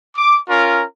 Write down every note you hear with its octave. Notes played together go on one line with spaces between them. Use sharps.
D6
C#4 F4 A#4